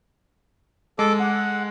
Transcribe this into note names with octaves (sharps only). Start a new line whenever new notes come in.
G#3 A4 D6
F#5